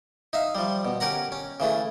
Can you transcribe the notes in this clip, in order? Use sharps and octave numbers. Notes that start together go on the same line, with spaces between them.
D#4 E5 F5
F3 G3
B2
C#4 G4 A#4 F#5 A#5
C#4
C#3 E3 A3